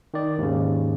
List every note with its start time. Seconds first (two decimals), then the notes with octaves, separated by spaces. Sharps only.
0.14 D#3 D5
0.38 D#2 G#2 C#3